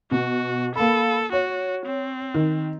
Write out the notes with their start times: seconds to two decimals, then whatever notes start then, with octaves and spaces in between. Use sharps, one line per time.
0.11 B2 F#4
0.75 A#3 A4 B5
1.32 F#4 C#5
1.86 C4
2.34 D#3